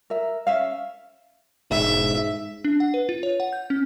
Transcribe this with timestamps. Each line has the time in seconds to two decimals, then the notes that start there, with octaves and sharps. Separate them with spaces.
0.10 A#4 E5
0.47 C#4 E5 F5
1.71 E1 G#2 E5
2.65 D4
2.80 F#5
2.94 B4
3.09 F4
3.23 C#5
3.40 F#5
3.53 G6
3.70 C#4